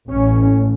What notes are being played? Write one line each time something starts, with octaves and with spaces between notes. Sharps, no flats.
A1 A2 C#4